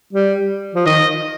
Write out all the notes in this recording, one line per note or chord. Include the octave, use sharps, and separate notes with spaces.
G3
F3
D#3 D#5